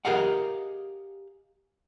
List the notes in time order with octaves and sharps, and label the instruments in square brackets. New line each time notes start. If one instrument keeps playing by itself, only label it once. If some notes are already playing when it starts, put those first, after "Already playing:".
[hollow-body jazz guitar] G4 G#4 A#4 D#5 F5 F#5